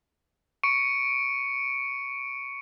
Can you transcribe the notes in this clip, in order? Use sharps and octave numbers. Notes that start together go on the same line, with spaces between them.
C#6 C#7 D7